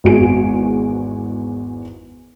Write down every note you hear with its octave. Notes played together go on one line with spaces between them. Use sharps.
G#1 E2 G#3 F#4 G#5 D7